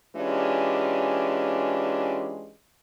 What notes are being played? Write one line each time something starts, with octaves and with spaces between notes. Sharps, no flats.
E3 G#3 C#4 D4 F4 G4